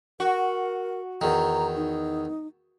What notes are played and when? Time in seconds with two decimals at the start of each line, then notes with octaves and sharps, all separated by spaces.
0.20 F#4 A#4
1.21 E2 D#3 A#5
1.77 D#4